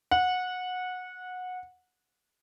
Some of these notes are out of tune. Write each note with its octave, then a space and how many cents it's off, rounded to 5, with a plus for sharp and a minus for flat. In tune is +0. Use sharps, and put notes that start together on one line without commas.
F#5 -20